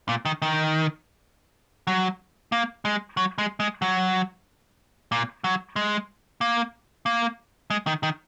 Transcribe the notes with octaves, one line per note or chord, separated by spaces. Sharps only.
A#2
D#3
D#3
F#3
A#3
G#3
F#3
G#3
G#3
F#3
A#2
F#3
G#3
A#3
A#3
G#3
D#3
D#3